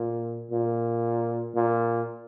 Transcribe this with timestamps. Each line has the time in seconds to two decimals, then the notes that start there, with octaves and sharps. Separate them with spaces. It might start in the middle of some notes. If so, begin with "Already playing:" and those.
Already playing: A#2
0.51 A#2
1.55 A#2